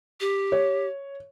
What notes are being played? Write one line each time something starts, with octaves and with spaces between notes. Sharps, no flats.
G4
C#5